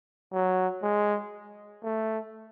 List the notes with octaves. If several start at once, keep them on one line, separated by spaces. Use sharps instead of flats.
F#3
G#3
A3